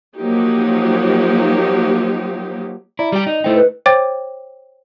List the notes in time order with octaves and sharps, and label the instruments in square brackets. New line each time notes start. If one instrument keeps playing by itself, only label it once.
[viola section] F3 F#3 A#3 D#4 G4
[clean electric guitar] E4 [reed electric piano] D5 A#5
[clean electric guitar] G3 G4
D#4
[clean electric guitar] A3 D#4 [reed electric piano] E4 C5 G5
[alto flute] B4
[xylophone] C5 C#5 G5 D6 A6